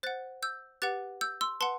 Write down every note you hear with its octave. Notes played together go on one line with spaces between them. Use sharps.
C5 F#5 F#6 A6
E6 G6
G4 B4 F#5 F#6 A6
E6 G6
C6 E6
B4 F#5 A5 C6